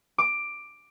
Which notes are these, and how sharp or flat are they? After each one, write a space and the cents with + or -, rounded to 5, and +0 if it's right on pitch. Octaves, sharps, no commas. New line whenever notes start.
D6 +10